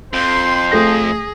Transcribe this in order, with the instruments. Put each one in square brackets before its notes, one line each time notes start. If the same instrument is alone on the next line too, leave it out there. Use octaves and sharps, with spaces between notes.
[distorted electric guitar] F2 [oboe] C5 [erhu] C6
[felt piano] A3 A4 A#6 [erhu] G#4